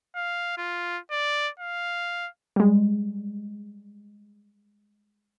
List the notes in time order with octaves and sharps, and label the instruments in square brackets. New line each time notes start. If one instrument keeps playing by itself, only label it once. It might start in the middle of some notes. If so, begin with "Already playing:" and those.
[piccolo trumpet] F5
F4
D5
F5
[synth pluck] G3 G#3